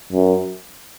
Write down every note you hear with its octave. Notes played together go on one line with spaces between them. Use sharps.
F#2